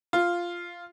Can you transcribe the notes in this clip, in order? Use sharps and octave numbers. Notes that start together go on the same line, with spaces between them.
F4